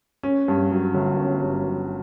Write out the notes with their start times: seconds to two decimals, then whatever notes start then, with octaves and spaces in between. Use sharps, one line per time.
0.23 C#4
0.48 G2
0.71 F#3
0.94 G1
1.18 C#4
1.41 G2
1.65 F#3